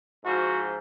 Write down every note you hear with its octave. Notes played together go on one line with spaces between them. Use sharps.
G#2 F3 F#4